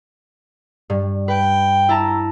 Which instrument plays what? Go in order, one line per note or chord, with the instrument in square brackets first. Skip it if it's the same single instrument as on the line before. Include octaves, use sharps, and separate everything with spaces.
[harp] G2
[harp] B4 [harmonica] G5
[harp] E4 A5 A#5